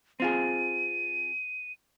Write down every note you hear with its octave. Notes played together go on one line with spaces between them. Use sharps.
C4 F4 G#4 D#7